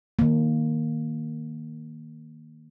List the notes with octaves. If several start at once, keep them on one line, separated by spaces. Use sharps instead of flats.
D#3 A#3